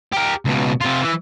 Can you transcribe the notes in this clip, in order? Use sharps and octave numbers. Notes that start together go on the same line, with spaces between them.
G4 A#4
C#2 B2
C3 F4
E3